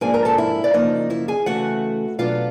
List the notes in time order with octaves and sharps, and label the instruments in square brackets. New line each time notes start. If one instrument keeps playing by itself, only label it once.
[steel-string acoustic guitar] G#2 F3 A#3 D4 G#4 G#5
A#4 A#5
A4 A5
E4 E5
D5
F#2 C#3 F3 A#3 D#4 D#5
E4 E5
G#4 G#5
C#3 E3 A3 F#4 F#5
B2 F#3 B3 D4 F4 F5